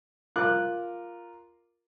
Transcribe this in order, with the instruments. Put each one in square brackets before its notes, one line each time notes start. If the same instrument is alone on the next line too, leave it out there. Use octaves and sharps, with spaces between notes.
[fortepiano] F4 A#4 D6 F#6